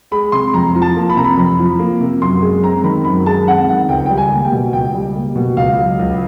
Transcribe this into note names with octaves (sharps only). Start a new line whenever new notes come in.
G#3 B5
C3 C6
F2 A#5
F3
A5
A#3
B5
C3 A#5
B5
F2
F3
A#3
C3
F#2 C6
G#3
C4 A#5
D#3 B5
F#2 B5
G#3 A5
C4 F#5
D#3 F#5
C#2 G5
G3 G5
G#5
A#3
G5
B2
C#2 G5
G3
A#3
B2
C#2 F5
F#3
C#2